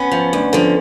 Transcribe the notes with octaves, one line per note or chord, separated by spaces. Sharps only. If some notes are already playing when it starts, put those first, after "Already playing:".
Already playing: B3 C#4
F3
D2
D3 F3